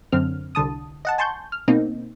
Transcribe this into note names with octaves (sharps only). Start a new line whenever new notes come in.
F#2 D3 C4 F6
C2 D3 A5 D#6
D#5 F#5 A5
G#5 A5 C6 C#6 G6
F6
B2 A#3 C4 D#4